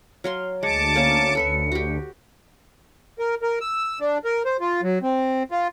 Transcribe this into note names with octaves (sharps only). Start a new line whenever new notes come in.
F#3 F5 C6
D2 G#3 A5 D6 C#7
A#3 C#4
D2 A4 B4 E5
F#4 G4
A#4
A#4
E6
D4
A#4
C5
F4
F#3
C4
F4